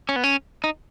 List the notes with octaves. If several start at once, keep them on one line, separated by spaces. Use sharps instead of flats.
C#4
B3
C#4
D#4